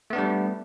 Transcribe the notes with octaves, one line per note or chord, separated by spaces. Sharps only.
G3 A3 B3 D4